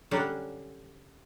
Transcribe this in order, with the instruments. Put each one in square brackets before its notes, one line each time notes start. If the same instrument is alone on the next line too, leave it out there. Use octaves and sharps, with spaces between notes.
[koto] D3 F#3 G3 C#4 D4